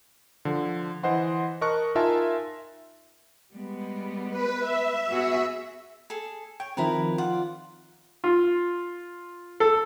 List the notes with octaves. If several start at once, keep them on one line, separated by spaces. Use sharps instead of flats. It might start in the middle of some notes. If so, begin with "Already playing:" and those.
D3 F3
E3 C5 D#5 F#5 C6
A#4 D#5 A5 C#6 F#6
D#4 F4 A#4 E5 G#5 A5
G3 G#3 B3
B4
E5
B3 F#4 G#4
G#4 A4
C#5 G5
D#3 F3 C4 E4 A#4 B4
F4 D5 F#5
F4
A4